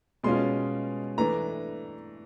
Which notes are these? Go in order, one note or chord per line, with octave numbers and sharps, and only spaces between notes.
B2 G#3 C#4 F4 C6
E3 A3 D4 A#5